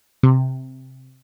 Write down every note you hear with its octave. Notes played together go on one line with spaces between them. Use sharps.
C3